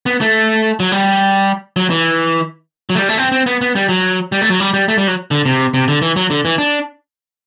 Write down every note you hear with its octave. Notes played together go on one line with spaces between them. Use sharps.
B3
A3
F#3
G3
F#3
E3
F#3
A3
G3
A3
C4
C4
B3
B3
G3
F#3
G3
A3
F#3
G3
G3
A3
G3
F#3
D3
C3
C3
D3
E3
F#3
D3
E3
D4